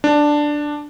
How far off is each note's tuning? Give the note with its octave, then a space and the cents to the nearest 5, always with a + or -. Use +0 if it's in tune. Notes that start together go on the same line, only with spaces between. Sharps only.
D4 +5